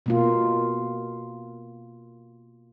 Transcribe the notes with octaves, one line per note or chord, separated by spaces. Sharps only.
B2 A#3 F4